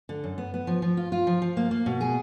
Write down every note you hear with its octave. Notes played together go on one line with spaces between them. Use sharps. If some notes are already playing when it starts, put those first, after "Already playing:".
D3
F#2
B3
B3
F3
F3
F4
F4
F3
F3
A#3
A#3
B2
G#4